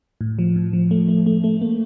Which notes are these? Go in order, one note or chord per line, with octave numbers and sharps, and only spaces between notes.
A2
F3
A2
F3
A3
A3
A3
A3
A#3